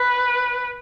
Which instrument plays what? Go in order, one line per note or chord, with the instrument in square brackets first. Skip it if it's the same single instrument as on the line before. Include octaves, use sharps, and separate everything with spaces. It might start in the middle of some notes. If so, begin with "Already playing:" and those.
Already playing: [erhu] B4